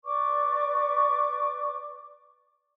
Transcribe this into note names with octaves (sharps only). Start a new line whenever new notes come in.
B4 D5 C#6 D6